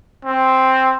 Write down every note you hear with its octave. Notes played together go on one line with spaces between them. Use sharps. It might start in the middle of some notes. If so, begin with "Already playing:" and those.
C4